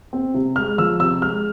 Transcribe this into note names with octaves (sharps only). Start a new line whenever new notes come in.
C4
C3
G#3 F6
F3 E6
C3 E6
G#3 F6